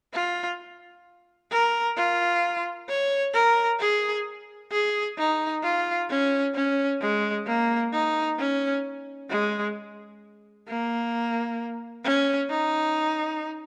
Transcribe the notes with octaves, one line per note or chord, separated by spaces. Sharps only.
F4
A#4
F4
C#5
A#4
G#4
G#4
D#4
F4
C#4
C#4
G#3
A#3
D#4
C#4
G#3
A#3
C#4
D#4